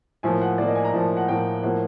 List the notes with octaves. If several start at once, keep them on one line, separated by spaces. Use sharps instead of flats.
A2 F3 A#3 G#5
F#5
A2 F3 A#3 D5
D#5
G#5
A#5
A2 F3 A#3 A5
F#5
A2 F3 A#3 G5
A2 F3 A#3 F#5